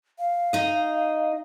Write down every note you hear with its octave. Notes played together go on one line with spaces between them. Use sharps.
F5
D#4 D#5